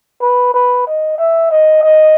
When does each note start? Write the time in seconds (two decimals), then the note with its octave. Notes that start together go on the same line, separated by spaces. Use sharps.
0.22 B4
0.54 B4
0.87 D#5
1.18 E5
1.51 D#5
1.83 D#5